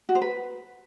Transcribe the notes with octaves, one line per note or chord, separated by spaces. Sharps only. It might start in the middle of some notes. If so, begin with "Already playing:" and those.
F#4
C5
B4